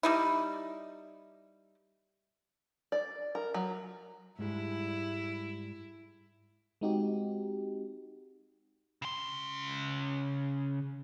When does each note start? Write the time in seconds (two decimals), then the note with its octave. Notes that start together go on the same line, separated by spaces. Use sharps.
0.03 G3 D#4 E4
2.92 D5
3.35 A#4
3.54 F#3
4.39 G#2 G3 G#3 E4
6.81 G#3 C4 D#4 F#4 G4
9.02 C#3 C6